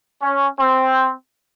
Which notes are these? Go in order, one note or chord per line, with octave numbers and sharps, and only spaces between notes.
C#4
C4